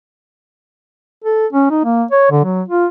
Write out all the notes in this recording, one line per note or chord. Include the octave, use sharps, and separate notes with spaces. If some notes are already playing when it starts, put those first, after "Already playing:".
A4
C#4
D#4
A#3
C#5
D3
F#3
F4